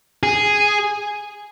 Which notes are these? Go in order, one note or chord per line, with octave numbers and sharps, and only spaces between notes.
G#4